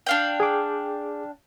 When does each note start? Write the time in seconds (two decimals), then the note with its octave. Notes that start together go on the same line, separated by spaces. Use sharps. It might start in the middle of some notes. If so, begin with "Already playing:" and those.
0.06 D4 F5 G5
0.40 G#4 D6